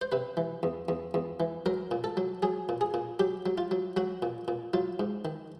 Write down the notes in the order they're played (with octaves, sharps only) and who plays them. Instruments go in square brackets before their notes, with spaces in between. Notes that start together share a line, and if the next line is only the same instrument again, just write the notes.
[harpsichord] C5
C3 B4
E3
E2
E2
E2
E3
F#3 A#4
A#2
A4
F#3
F#3 G#4
A#2
G#4
A#2
F#3 G4
F#3
F4
F#3
F#3 F#4
A#2
A#2
F#3 F4
G#2
D#3